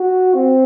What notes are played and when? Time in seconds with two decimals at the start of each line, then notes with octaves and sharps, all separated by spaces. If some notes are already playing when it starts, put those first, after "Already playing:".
Already playing: F#4
0.34 C4